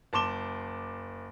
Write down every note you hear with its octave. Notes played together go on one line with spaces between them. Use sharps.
F#1 A5 C6 D6 E7 G7